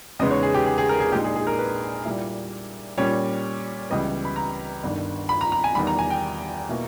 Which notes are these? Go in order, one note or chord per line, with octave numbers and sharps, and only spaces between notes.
E2 C#3 G#3 B3 D#4 D#5
C#5
G#4
G4
G#4
G#4
A#4
G#4
A#1 A#2 G#3 D#4 G4
G#4
G#4
A#4
B4
A#2 G3 A#3 E4
A#2 G3 C#4 C#5
C#2 C#3 E3 G3 B3 D#5
B5
A#5
G1 G2 D#3
B5
A#5
A#5
G#5
E2 D#3 G3 B5
A#5
G#5
G5
B2 A#3 E4